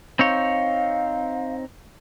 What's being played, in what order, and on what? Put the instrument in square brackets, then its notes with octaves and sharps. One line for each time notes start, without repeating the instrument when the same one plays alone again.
[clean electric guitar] C4 D#4 C#5 [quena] F5